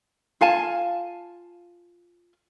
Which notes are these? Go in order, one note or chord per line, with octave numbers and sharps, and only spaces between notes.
F4 F5 G#5 A5